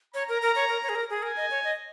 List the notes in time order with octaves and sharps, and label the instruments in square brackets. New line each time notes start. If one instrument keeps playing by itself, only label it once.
[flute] C#5 [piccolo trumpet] A#5
[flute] A#4
A#4
C#5
A#4
C#5
G#4
A#4
G#4
[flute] A#4 [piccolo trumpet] G#5
[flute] D#5
C#5
D#5